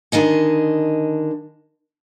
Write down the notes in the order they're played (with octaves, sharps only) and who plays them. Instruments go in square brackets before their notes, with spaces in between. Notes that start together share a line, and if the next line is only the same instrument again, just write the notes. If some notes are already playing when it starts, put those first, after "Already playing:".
[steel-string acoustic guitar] D3 D#3 D#5 G#5